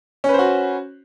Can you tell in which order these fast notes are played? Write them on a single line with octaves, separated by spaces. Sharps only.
C#4 B4 C5 F#4